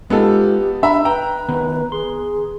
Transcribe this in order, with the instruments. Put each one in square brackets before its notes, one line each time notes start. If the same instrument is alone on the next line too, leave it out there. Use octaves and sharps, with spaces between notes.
[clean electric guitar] G#3 F4 [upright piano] B3 D#4 A4 [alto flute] G4
[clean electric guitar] D4 [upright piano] E5 A#5 B5
[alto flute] B4 [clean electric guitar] G5 [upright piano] A#5
[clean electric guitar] D#3 B3
[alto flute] G#4 [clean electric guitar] C6